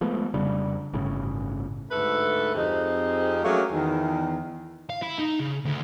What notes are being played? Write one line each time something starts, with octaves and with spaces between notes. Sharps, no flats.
F3 G#3 A3 B3
F1 C#3 G3 D4
G1 A2 C#3
D2 G#2 A3 A4 B4
F2 C4 D#4 G4 G#4
F#3 A3 A#3 C#4 G#4
E2 D#3
F5
E4
D#4
C#3
D2